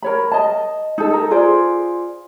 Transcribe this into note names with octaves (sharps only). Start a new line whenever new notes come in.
A#4 C#5 B5
D#5 A5
D#4 A4
A4 A#4
F4 G#4 C5 D5